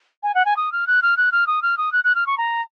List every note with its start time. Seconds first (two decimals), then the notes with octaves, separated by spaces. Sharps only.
0.23 G#5
0.35 F#5
0.45 G#5
0.57 D#6
0.72 F6
0.87 F#6
1.02 F6
1.17 F#6
1.32 F6
1.47 D#6
1.62 F6
1.78 D#6
1.92 F#6
2.04 F#6
2.15 F6
2.27 C#6
2.38 A#5